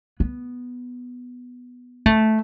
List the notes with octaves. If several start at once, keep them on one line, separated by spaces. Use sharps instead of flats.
B3
A3